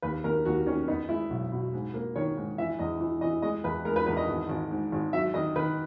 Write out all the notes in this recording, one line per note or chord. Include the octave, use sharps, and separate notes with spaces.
D#2 B4
D#2 A#4
D#2 F#4
D#3 C#4
B3 D#4
G#3 E4
B1
B2
G#2
A#3
D#3 C#5
G#2
E3 E5
E2 D#5
E3
E3 D#5
G#3 D#5
E2 B4
G#3 A#4
B4
E2 B4
D#5
G#1
G#1
G#2
G#1
F#3 E5
D#3 D#5
D#3 B4